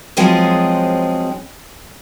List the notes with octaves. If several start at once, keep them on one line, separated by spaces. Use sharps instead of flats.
F3 F#3 G#3 C4 C#4 G#4